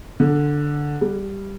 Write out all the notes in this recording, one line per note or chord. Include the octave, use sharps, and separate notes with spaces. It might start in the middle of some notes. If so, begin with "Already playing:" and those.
D3
G3